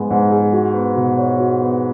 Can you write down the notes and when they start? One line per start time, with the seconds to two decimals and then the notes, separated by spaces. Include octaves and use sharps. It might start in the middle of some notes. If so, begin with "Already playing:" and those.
Already playing: G#2 G#3 B3 G#4
0.10 G#2
0.31 G#4
0.53 F#4
0.74 B3
0.96 B2
1.17 C#5
1.39 F#4
1.60 B3